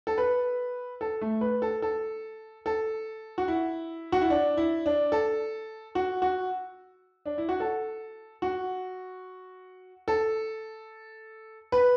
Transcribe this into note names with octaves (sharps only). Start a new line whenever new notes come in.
A4
B4
A4
A3
B4
A4
A4
A4
F#4
E4
F#4
E4
D4
E4
D4
A4
F#4
F#4
D4
E4
F#4
A4
F#4
A4
B4